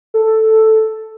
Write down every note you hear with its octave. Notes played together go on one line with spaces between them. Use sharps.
A4